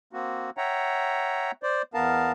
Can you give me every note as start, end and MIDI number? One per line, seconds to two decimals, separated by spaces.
0.13 0.50 58
0.13 0.50 60
0.13 0.50 66
0.57 1.51 73
0.57 1.51 76
0.57 1.51 78
0.57 1.51 79
0.57 1.51 82
1.63 1.82 72
1.63 1.82 74
1.94 2.32 40
1.94 2.32 59
1.94 2.32 70
1.94 2.32 77
1.94 2.32 81